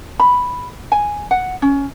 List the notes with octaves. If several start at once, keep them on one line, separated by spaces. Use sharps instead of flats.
B5
G#5
F#5
C#4